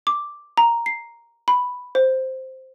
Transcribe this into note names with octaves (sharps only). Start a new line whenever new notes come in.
D6
A#5
C7
B5
C5